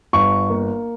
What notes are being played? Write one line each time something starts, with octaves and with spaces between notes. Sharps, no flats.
G1 C#6
A#3